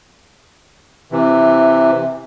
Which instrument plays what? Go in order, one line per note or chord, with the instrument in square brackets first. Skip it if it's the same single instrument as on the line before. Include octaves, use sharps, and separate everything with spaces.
[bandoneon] C3 E3